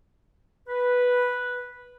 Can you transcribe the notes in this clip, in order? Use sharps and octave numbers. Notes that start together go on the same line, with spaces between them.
B4